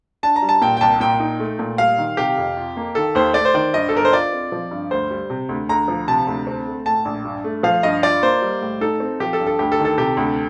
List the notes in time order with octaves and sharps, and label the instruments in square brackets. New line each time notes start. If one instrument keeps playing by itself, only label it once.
[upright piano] D4 [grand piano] A5
[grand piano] A#5
[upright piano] G3
[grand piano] A5
[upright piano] A#2 [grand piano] G5
[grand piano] G5
[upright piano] C2 [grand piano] A5
[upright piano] A#2 [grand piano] G5
[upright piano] D#4
A3
A#2
[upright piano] G3 [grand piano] F5
[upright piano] D#3
[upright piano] C3 [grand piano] G4
[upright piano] F2
F4
A#3
[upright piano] D#3 [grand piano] A4
[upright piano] D#2 [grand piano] C5
[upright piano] A3 [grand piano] D5
[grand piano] C5
[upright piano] D#3 [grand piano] D5
[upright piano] G2 [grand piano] D#5
[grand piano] A4
[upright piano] G1 [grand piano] A#4
[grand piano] C5
[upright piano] F4 [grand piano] D5
[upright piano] C4
F3
G2
[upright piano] D2 [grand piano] C5
[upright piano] G3
C3
D2
[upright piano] D2 [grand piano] A#5
[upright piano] F3
[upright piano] C3 [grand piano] A5
[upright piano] D2
C4
A3
[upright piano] A2 [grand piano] A5
[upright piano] A#1
G2
A3
[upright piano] F3 [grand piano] F5
[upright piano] G2 [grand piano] D#5
[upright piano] F4 [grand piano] D5
[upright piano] A#3 [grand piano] C5
[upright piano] G3
A2
[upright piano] D#4 [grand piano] A4
[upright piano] C4
[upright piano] F3 [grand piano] G4
[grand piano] A4
[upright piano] G2
[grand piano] A4
[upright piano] D2 [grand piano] G4
[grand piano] A4
[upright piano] D#3
[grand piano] A4
[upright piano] C3 [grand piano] G4
[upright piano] D2